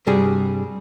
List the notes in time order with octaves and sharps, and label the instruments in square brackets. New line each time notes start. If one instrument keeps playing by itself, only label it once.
[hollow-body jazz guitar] G2 C3 G3 F#4 G#4